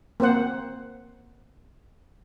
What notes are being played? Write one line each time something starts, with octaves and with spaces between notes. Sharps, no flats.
A#3 C4 C5 F#5